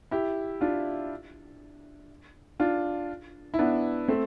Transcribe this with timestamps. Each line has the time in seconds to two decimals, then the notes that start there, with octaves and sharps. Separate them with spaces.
0.11 E4 G4
0.61 D4 F4
2.60 D4 F4
3.54 E4
3.59 B3 D4
4.08 A3 C4